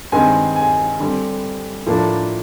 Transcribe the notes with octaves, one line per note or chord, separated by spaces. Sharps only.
G2 D#3 G#3 C4 G#5
G#5
D3 G3 C4
A2 F3 A#3 D4